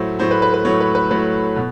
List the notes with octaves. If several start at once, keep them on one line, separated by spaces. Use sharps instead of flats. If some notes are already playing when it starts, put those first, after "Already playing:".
Already playing: A2 F#3 A3 C5
A2 F#3 A3 C5
B4
B4
B4
A2 F#3 A3 C#5
B4
B4
A2 F#3 A3 B4
B2